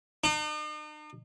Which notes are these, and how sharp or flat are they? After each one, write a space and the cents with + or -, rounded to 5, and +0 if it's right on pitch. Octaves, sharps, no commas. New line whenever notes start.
D#4 -45